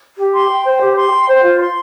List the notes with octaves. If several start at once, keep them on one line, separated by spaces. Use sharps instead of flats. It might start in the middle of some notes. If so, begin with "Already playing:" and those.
G4
C6
G5
C5
G4
C6
G5
C5
F4
C6